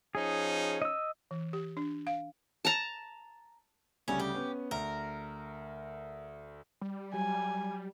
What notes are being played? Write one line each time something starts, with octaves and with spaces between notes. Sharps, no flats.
F3 C#4 D#4 G#4
D#5 E6
E3
G4
D4
F5
A5 A#5
D2 C#3 G3 C#4
G4
B3 C#4
D2 A#4
G3
F#3 G4 G#5